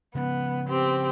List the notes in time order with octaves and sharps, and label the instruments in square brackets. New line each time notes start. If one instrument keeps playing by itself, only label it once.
[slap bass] C#3 F3 G#3 [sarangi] B3
[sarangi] C4 [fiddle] G4